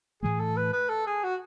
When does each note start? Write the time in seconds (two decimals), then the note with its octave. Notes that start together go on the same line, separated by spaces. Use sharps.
0.23 A2 E3 A3 G#4
0.40 A4
0.56 B4
0.73 B4
0.89 A4
1.06 G#4
1.23 F#4